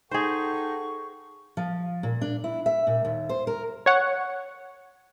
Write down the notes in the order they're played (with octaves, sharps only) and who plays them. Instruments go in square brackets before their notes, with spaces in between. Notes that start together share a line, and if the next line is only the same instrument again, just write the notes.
[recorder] D#4 [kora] G#4 C5 [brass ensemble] A4 F#5 G5 [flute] C#6
[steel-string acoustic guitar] F3
A#2
D4
E4
E5
A#2
D#2
C5
A#4
[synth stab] C#5 F#5